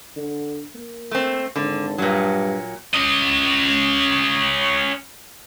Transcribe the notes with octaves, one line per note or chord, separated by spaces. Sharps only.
D3
A#3
A3 C4
G#1 D3
G2 A#2 F#3
C#4 D#5